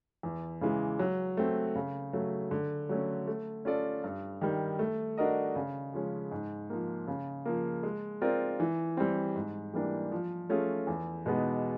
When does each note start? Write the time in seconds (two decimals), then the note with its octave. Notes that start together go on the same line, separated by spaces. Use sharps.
0.23 E2
0.61 C#3 E3 G#3
0.99 F#3
1.37 A3 C4
1.75 C#3
2.13 F#3 A3
2.51 D3
2.89 F#3 A3 C#4
3.27 A3
3.65 C#4 F4 A4 D5
4.03 G2
4.41 D#3 G3
4.79 A3
5.17 D4 F#4 A#4 D#5
5.55 C#3
5.94 F3 G#3 C#4
6.31 G#2
6.70 F3 A#3
7.07 C#3
7.45 F3 A#3
7.83 G#3
8.21 C4 F4 A#4 D5
8.60 E3
8.97 G3 C4
9.36 G#2
9.74 E3 G3 A#3 D4
10.12 F3
10.49 A3 C#4 F4 G#4
10.87 E2
11.26 B2 G#3 B3 D#4